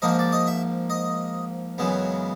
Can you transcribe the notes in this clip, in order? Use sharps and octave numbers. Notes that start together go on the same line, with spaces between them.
G#2 F3 A#3 D#5
D5
D#5
E5
D#5
F#2 C#3 E3 G#3 B3